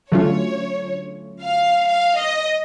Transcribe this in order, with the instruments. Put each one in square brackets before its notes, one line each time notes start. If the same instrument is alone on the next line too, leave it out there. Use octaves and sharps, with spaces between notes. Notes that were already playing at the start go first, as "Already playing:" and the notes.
[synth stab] D3 F#3 A3 C#4 F4 [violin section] C#5
[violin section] F5
F5
D#5